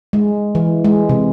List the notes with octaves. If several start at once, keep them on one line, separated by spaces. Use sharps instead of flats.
G#3
E3
G#3
C3